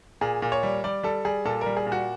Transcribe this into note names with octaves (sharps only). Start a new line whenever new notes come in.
A#2 G#4
A#2
C#5
G3
G3 D5
G3 A4
G3 G#4
A#2 A4
A#4
G3
G#4
A#2
F#4